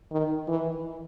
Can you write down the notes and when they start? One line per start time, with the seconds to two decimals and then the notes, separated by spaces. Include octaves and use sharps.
0.11 D#3
0.48 E3